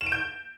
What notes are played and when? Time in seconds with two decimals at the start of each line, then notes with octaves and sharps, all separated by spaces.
0.01 E7
0.06 D7
0.12 G6